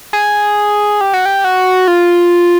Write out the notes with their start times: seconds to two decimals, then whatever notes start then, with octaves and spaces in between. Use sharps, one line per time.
0.13 G#4
1.01 G4
1.13 F#4
1.26 G4
1.44 F#4
1.88 F4